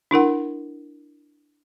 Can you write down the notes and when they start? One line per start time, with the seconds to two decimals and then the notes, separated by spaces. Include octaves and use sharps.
0.11 D4 E4 A#4 F#5